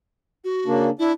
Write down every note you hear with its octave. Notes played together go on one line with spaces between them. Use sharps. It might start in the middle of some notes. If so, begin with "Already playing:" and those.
F#4
C#3 A#3 D4
D4 E4